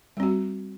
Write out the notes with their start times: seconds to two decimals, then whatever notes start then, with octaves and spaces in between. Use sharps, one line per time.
0.17 G3
0.20 C4
0.23 F#4